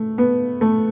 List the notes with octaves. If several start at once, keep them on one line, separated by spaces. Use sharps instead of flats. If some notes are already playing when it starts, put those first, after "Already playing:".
Already playing: A3
B3
A3